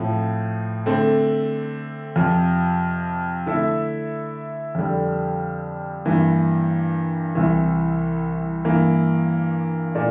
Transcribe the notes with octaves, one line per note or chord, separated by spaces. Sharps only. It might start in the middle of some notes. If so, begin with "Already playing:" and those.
Already playing: A2 F3 C4
D3 A3 C4
F2 C3 F3
D3 A3 E4 A4 E5
F2 D3 G3
G2 E3 A#3
C2 C3 E3
G2 E3 A#3
A#2 A3 D4